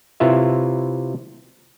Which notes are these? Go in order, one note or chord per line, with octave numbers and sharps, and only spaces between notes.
C3 E4 F4 B4 C#5 E5